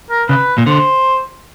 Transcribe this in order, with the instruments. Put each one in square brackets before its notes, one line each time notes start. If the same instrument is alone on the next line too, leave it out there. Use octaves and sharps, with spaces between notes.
[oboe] A#4
[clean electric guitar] C#3 [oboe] B4
[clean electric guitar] A#2
[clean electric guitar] D3 [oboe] C5